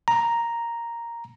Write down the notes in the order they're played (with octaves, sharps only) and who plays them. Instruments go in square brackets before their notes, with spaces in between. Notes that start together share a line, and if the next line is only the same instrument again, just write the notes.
[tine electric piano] A#5